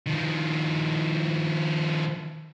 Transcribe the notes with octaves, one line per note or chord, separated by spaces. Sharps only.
D#3 F3